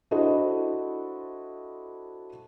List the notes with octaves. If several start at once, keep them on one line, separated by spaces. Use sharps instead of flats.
D4 E4 F#4 A4 C5 D#5